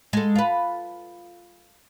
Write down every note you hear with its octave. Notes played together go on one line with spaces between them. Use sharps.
G#3 A4
F4 B4